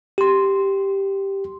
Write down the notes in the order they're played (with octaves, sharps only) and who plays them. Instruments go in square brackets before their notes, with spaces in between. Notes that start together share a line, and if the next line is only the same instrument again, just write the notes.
[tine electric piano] G4 C6